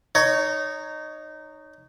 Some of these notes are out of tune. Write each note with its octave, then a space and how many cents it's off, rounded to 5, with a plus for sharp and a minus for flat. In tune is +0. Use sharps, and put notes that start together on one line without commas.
D#4 -15 C#5 +10